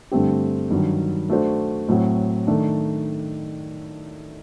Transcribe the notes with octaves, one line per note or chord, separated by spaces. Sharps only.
G2 D3 A3 C4 G4
G2 D#3 F#3
A3 D4 F#4 C5
A2 F#3 C4 F#4
D#3 A3 D4